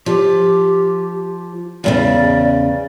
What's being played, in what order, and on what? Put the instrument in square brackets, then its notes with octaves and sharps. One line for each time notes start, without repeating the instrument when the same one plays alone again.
[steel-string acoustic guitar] F3 [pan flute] G4
[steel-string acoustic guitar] E2 A#2 C#3 [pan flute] D5